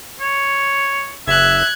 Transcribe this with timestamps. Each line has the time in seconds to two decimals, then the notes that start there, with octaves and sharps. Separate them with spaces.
0.21 C#5
1.28 F#1 E5 F#6 G#6